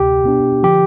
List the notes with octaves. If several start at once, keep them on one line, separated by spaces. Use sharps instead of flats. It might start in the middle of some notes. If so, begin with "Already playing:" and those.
Already playing: D2 C3 G4
B2 B3 D4
D3 F3 G4